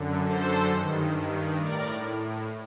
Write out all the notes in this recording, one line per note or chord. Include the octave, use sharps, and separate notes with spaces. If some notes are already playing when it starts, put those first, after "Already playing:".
Already playing: F#2 D3
A4 C5
G2 D#3
A2 A#4 D5